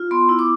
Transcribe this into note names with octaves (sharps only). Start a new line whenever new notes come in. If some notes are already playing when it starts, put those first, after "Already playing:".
Already playing: F4
B3 C6
E4
D6